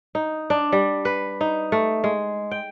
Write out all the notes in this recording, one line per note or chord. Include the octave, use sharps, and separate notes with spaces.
D#4
D4
G3
B4
D#4
A3
G#3
G5